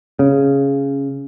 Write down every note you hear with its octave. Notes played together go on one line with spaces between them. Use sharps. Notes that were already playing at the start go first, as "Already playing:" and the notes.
C#3